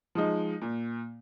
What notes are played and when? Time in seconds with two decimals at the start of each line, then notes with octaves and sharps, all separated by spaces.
0.15 F3 G#3 D#4
0.62 A#2